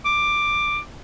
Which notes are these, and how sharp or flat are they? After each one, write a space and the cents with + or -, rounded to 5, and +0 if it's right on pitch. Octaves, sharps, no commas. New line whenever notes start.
D6 +10